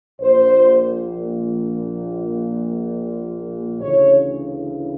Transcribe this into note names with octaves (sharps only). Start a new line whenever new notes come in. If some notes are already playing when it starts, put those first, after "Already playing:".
A#1 A#2 C5
D2 C#3 E3 C#5